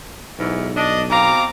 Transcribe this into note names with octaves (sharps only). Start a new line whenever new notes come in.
B1 E2 G#2
D4 D#5
B2 C4 F5 A#5 D6